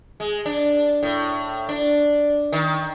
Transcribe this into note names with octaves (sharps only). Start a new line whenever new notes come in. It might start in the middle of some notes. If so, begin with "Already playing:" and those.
G#3
D4
A2
D4
D#3